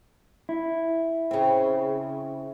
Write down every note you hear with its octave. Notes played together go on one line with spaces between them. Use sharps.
E4
C#3 C4